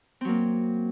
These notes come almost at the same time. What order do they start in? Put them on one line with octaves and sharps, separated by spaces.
C4 F#3 A#3